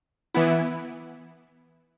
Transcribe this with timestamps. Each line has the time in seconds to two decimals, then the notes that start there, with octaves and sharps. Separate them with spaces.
0.34 E3 B3 E4